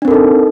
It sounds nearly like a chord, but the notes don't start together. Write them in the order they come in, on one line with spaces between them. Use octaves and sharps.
D4 C4 A#4 A4 D#4